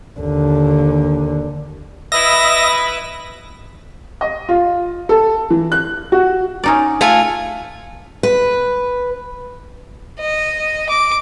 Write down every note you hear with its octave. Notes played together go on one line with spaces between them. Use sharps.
D#2 D3
E4 B4 D#5 E5 A#6
D#5
F4
A4
E3
F#6
F#4
C#4 D#4 D5
A3 F4 G#5
B4
D#5
D6